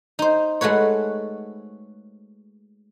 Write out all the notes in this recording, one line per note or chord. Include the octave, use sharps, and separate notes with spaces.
D#4 C5
G#3 A3 F#4 B4 C#5